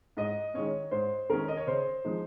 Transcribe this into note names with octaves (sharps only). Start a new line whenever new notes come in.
G#2 D#5
D#3 G#3 C#4 C#5
G#2 C5
D#3 G#3 C#4 A#4
D#5
C#5
C#3 C5
F3 G#3 D#4